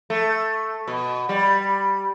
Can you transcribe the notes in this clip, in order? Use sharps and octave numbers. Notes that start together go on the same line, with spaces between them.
A3
B2
G3